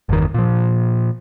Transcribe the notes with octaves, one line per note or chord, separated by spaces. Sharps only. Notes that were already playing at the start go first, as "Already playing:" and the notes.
G1 E2 D#3
A#2 F3